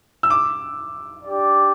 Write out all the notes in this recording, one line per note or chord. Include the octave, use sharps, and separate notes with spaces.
E6
D6
D4 G4 D5